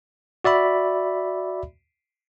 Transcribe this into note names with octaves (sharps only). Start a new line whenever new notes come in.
F#4 D5 E5 B5